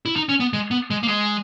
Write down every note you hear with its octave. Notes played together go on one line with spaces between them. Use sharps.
E4
D#4
C#4
B3
G#3
B3
G#3
A#3
G#3